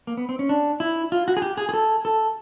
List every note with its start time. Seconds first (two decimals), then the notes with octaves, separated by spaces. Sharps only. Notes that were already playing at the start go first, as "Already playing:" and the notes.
0.07 A#3
0.17 B3
0.29 C4
0.39 C#4
0.49 D4
0.80 E4
1.12 F4
1.28 F#4
1.37 G#4
1.42 G4
1.57 G#4
1.69 G#4
1.74 A4
2.05 A4